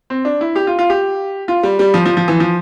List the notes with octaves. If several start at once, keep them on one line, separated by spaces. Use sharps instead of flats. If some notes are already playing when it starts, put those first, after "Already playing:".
C4
D4
E4
G4
F4
F4
G4
F4
G3
G3
F3
F3
F3
E3
F3